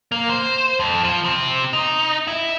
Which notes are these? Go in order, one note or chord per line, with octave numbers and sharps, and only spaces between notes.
A#3
C5
F2
F3
C3
D#4
E4